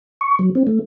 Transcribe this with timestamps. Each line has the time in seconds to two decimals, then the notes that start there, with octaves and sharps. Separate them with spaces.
0.21 C#6
0.39 F#3
0.55 C4
0.67 A3